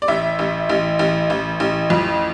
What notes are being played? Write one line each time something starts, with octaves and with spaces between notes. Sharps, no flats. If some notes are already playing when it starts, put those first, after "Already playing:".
D5
A1 E5
A1
A1
A1
A1
A1
F2